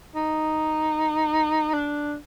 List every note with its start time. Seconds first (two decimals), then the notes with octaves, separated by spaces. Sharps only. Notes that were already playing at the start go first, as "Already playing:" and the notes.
0.16 D#4
1.74 D4